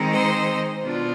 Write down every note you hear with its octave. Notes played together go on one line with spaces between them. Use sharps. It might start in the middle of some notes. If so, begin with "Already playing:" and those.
Already playing: D#3 G#3 C4 D#4
C5 D#5
B2 B3 D4 F4